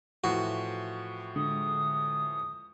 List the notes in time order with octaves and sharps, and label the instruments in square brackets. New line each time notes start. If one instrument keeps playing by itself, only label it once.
[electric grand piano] A2 E3 F3 [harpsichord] F#4
[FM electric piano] D3 G#3 [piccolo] D#6